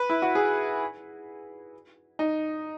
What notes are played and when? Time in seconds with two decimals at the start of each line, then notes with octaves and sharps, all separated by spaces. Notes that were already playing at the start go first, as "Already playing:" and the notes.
Already playing: B4
0.10 E4
0.22 F#4
0.35 G#4
2.19 D#4